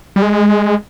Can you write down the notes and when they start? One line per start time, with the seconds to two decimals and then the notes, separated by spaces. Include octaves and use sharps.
0.16 G3
0.22 G#3